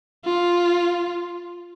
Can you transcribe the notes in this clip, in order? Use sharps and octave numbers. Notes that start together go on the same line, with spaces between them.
F4